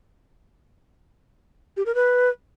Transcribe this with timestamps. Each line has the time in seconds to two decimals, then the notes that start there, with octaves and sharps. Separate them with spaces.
1.77 G4
1.86 A#4
1.95 B4